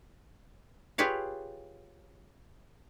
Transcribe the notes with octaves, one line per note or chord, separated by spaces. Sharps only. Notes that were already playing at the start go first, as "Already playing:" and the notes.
F4 G4 G#4 B4 C#5 F5